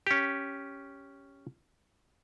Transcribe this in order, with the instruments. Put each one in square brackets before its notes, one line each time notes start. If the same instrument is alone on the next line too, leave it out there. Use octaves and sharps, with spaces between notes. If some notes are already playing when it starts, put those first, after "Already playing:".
[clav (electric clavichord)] C#4 G4